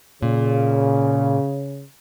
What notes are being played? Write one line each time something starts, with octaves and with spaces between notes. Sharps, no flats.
A#2 C#3